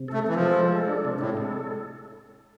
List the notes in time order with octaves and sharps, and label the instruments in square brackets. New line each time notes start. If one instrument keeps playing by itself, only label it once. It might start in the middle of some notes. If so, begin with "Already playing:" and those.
Already playing: [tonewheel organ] C3
[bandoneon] A3 [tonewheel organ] A4
[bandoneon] E3 [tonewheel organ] A4
[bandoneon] F3
[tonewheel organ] G#3
G#3
A4
D4
C3
[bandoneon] A2 [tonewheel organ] G#3
[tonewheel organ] A4